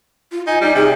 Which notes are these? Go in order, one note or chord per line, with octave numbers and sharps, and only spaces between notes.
F4
D#4 G#5
G3 D#4
C3 G#4